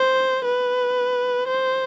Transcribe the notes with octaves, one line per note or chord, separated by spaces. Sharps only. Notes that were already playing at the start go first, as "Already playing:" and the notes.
Already playing: C5
B4
C5